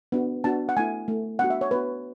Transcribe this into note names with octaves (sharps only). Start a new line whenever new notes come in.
B3 D4 F#4
B3 D4 F#4 A5
F#5
A3 E4 G#5
A3 E4
B3 D4 F#4 F#5
E5
C#5
B3 D4 F#4 B4